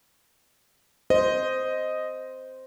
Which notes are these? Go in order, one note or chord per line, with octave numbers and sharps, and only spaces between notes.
C5 D#5